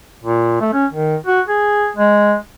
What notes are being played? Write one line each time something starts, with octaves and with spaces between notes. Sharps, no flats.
A#2
A3
C#4
D#3
F#4
G#4
G#3